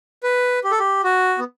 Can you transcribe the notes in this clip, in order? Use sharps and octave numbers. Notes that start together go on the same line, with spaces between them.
B4
G4
A4
G4
F#4
B3